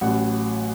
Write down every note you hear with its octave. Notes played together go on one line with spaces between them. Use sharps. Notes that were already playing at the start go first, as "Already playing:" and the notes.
A1 A2 F#3 F#5